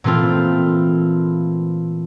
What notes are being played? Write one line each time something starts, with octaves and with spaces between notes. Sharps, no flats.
A#2 E3 A3 C4 F4